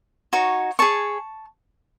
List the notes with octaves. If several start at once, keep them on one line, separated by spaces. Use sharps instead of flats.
D#4 F#4 C#5
G#4 C#5 A5 C#6